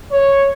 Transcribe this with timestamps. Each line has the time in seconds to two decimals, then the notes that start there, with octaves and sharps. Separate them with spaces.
0.12 C#5